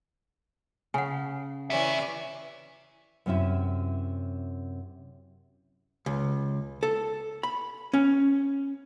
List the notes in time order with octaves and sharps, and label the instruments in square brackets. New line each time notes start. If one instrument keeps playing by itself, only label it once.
[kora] C#3 [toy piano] F#5 G#5
[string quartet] E3 C#4 D5 [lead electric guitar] G4 E5
[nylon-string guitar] F#2 C3 C#4 E4 E5
[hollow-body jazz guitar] C#2
A4
B5
C#4